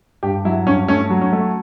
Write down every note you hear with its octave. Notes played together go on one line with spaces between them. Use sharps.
G2 G4
F#3 E4
G2 C#4
A3 C#4
F#3
C#4
A3